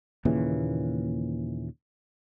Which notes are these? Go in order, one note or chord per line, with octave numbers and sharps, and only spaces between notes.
D#2 A#2 C#3 E3